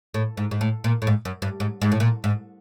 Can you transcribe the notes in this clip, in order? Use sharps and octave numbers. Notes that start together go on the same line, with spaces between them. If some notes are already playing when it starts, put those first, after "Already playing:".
A2
G#2
G#2
A2
A#2
A2
G#2
F#2
G2
G#2
G#2
A2
A#2
G#2